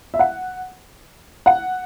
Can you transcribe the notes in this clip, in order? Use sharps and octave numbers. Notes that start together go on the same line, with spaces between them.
E5
F#5
F#5